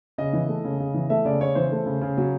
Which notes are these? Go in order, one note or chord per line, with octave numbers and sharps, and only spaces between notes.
C#3 D#5
E3
A3
C#3
C#3
E3
A3 E5
C#3 D5
C#3 C#5
E3 C5
A3
C#3
C#3
F#3